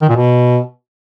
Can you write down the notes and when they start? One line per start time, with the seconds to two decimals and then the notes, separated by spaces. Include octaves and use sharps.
0.02 D#3
0.09 A#2
0.16 B2